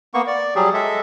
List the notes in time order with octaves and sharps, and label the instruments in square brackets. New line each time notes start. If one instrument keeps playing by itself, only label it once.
[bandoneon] A#3 B3 C#6
D5
F#3 G3 G4 G#4
G#3 A4 E5